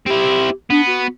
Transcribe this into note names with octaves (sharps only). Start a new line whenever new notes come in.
C4 E4 G4
B3 D4
F#4